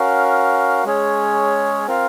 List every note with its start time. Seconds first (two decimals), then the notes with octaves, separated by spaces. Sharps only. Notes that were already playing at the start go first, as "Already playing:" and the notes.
Already playing: C#4 F#4 A#4 F5
0.85 G#3 C#4 G#4 C#5
1.87 C4 F4 A#4 F5